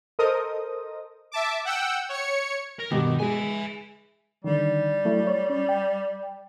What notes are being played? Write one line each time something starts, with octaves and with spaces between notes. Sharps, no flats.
A4 A#4 C5 D#5 D#6
E5 A5 D6
F#5 G5 E6
C#5 C#7
A#4
G2 B2 D#3 G4
G#3 E5 G#5
D3 D#3 G3
F#3 A3 E4
C#5
C#4
G5